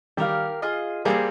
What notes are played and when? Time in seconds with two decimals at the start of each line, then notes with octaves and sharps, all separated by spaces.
0.17 D#3 G3 G4 A#4 F5
0.62 F4 G#4 D#5
1.05 G3 A#3 C4 F4 G#4